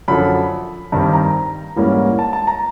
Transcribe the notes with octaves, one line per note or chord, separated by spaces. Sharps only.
F#2 D3 F3 B5
G2 D#3 G3 C4
A#5
G#2 E3 G3 A#3 C#4
A5
A5
A#5